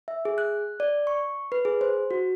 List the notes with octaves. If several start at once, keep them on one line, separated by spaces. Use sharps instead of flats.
E5
G#4
F#6
D5
C#6
B4
G#4
C5
F#4